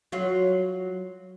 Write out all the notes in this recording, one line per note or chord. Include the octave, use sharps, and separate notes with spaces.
F#3 F4